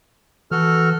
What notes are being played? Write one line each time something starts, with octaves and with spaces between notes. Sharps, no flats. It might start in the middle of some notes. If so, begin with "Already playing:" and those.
E3 F#4 A4 F6